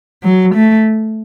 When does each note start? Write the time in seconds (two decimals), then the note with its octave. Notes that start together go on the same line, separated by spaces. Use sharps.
0.23 F#3
0.55 A3